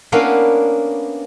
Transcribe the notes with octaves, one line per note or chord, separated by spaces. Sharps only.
A#3 B3 C#4 D4 E4 F5